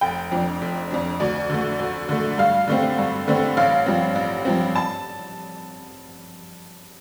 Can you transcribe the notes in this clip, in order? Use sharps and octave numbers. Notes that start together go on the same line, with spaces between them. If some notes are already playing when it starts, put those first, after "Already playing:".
F1 G5
F2 F3 D4
F1
F2 F3 D4
D2 D5
D3 A3
D2
D3 A3
G2 F5
D3 A3 C4
G2
D3 A3 C4
A1 F5
G2 F3 C4
A1
G2 F3 C4
A5